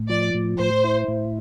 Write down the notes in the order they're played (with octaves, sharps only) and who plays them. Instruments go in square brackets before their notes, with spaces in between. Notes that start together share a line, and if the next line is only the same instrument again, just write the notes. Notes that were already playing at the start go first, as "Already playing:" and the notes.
Already playing: [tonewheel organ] A2
[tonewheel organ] F3 [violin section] D5
[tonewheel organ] A2
[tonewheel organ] A2 [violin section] C5
[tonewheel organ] E4
A2